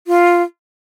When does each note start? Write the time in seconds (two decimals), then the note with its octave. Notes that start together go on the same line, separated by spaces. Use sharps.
0.07 F4